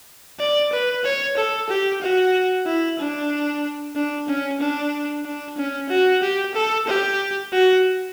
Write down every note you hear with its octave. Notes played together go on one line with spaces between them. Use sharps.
D5
B4
C#5
A4
G4
F#4
E4
D4
D4
C#4
D4
D4
C#4
F#4
G4
A4
G4
F#4